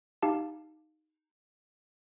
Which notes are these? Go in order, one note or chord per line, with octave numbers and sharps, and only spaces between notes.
D#4 G4 F5 A5